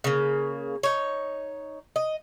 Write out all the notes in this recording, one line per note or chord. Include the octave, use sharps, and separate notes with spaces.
C#3 A#3
D#4 C#5
D#5